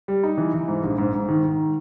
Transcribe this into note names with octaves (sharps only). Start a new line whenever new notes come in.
G3
D#4
E3
E3
G#2
A#1
G#2
G#2
D#3
D#3